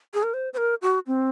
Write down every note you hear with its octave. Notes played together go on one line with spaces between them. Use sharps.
G#4
A#4
C5
C5
A#4
F#4
C4